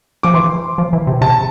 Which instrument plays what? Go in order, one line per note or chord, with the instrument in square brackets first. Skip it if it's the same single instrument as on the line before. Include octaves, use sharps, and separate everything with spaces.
[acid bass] F3 [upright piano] D6
[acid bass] E3 [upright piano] C6
[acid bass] F3
E3
C3
[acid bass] C3 [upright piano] A5